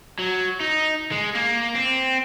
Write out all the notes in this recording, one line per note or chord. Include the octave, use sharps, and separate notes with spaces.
F#3
D#4
G#3
A#3
C4